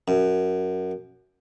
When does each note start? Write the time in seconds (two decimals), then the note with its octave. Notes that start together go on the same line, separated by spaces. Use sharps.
0.08 F#2